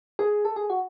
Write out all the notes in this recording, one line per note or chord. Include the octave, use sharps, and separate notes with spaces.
G#4
A4
G#4
F#4